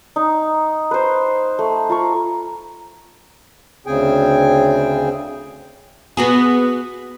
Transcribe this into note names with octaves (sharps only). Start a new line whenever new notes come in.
D#4
B4 C5
A3
F4 A#5 C#6
D2 C#3 C4 G#4 G5 G#5
B3 F#4 G#4